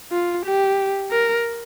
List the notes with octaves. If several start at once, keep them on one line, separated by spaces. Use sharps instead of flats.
F4
G4
A#4